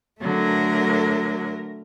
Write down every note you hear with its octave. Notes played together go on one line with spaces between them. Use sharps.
D3 F#3 A3 A#4